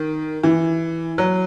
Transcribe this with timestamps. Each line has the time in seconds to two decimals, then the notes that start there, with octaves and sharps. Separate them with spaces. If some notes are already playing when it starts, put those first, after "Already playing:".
Already playing: D#3
0.44 E3
1.18 F#3